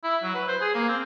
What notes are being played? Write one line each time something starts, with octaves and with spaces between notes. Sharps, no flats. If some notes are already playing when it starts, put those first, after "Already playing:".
E4
F#3
B4
C5
G#4
A#3
C4